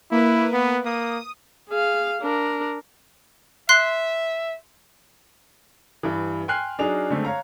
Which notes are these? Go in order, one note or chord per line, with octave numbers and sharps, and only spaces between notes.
A#3 E4 B4
B3
A#3 D#6
G#4 F5
D4 A#4
E5 C6 F#6 C7
G2 E3
G5 G#5 C6 F6 F#6 C7
F#3 D4 D#4 G#4 F7
D3 G#3 A3 C4
C#5 F5 A#5